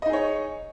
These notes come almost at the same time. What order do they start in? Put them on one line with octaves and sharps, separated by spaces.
D#5 D#4 G#4 C#5